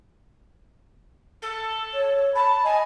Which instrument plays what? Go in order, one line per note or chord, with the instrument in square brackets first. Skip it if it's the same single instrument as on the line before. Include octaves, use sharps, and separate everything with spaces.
[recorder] A4
[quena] C#5
[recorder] A5 [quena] B5
[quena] D#5 [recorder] G#5